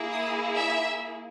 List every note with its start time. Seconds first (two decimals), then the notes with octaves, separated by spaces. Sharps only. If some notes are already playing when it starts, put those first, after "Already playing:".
Already playing: A#3 E4 G#4
0.11 D#6
0.57 E5